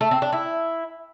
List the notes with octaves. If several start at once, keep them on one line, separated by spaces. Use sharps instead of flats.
A3
C4
D4
E4